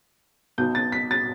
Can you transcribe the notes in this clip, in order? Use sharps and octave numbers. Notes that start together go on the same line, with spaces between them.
B1 B2 G6
A6
B6
A6